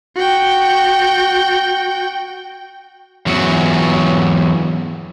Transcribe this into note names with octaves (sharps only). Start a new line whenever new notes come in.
F#4 G5
E2 F#3